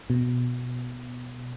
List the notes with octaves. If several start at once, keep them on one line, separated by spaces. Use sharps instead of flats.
B2